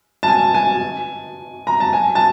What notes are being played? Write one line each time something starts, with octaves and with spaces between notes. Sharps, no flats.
A5
G#5
G#5
A#5
A5
G#5
A5